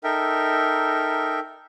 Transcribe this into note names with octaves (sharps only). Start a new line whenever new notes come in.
D#4 A4 A#4 E5 G5